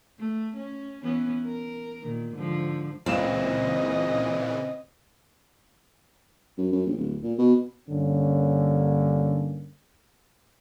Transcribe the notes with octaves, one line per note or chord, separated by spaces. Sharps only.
A3
C#4
E3 B3 C#4
A#4
A#2 D#3
G#2 D3 F3
C#2 A#2 C#3 E3 C4 D#5 E7
F#2
F#2
A#1
D1
A#2
B2
G2 D3 A#3 C#4